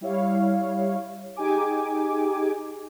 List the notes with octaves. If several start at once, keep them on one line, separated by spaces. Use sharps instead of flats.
G3 E4 C#5 F5
D#4 G4 G#4 G#5 D6